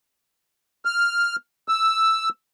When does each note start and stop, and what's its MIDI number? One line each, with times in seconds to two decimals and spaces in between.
0.85 1.36 89
1.68 2.29 88